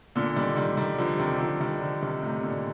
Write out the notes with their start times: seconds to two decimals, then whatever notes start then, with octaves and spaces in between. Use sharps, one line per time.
0.16 A#2 D3
0.36 D#3 G3
0.56 D#3 G3
0.77 D#3 G3
0.98 D3 F3
1.19 C3 D#3
1.40 D3 F3
1.60 D#3 G3
1.81 D3 F3
2.02 C3 D#3
2.22 A2 C3
2.43 A#2 D3